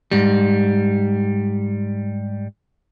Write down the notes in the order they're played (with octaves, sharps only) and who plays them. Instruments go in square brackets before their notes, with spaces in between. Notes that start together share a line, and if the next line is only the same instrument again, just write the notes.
[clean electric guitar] G#2 G3